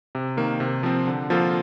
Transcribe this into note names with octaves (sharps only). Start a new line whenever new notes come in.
C3
D#3 A#3
C3
F3 C4
D3
F3 A#3 F4 A4